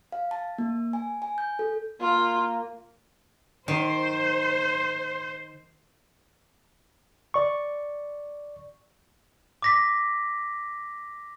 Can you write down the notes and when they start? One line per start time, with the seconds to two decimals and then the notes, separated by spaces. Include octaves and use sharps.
0.12 F5
0.31 A5
0.58 A#3
0.93 G#5
1.22 G#5
1.38 G6
1.59 A4
2.01 A#3 F4
3.68 D#3 C5
7.34 D5 C#6
9.62 D6 A#6 B6